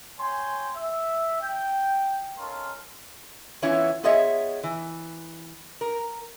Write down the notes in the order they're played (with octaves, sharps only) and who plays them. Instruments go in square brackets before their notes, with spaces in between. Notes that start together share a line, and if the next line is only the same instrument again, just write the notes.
[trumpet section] C#5 G5 G#5 C6
E5
G5
C#4 D#4 A4 A#4 F5 C6
[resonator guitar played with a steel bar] E3 B3 C#4 E4 F4 C#5
B3 F4 G#4 C#5 D#5 E5
E3
A#4